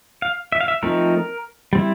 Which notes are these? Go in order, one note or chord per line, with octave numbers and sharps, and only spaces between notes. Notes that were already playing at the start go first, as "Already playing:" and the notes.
F5
E5
F5
E5
F3 A3 C4 D#4 A#4
G3 C4 E4